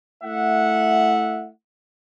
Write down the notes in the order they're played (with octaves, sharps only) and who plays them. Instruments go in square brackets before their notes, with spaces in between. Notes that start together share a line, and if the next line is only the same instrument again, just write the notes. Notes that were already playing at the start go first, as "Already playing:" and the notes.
[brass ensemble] A3 E4 E5 F#5